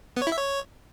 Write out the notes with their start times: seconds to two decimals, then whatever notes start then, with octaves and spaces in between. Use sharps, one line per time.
0.17 B3
0.22 C#5
0.27 E4
0.32 E5
0.37 C#5